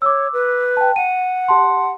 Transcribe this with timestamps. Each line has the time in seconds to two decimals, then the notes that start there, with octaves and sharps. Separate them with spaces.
0.02 C#5 D6 E6
0.33 B4
0.77 G5 A5
0.96 F#5 D#7
1.48 G4 A5 C6